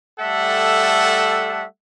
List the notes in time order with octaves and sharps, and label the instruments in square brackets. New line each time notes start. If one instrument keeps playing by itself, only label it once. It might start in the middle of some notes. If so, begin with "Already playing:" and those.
[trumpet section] G3 A3 A4 E5 F#5